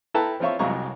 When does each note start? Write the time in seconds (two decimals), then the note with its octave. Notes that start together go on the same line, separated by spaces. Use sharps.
0.14 E4 A4 B4 G5 A5 A#5
0.40 F3 C4 F4 C#5 E5 C#6
0.59 C2 F2 F#3 G#3 A#5 C#6